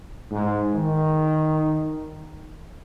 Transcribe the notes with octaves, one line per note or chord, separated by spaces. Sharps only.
G#2
D#3